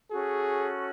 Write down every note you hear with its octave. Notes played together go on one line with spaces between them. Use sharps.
C#4 F#4 G#4 A4